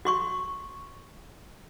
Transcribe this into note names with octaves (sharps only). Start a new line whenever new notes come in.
F#4 C6 C#6